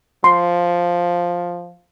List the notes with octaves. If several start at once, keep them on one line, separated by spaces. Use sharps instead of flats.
F3 C6